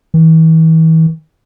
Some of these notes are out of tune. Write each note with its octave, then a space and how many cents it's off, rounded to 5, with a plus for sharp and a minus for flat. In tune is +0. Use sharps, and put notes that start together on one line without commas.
E3 -40